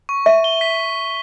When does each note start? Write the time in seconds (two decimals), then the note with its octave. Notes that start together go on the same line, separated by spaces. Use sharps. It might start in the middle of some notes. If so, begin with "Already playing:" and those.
0.09 C#6
0.26 E5 D#7
0.44 G7
0.61 B6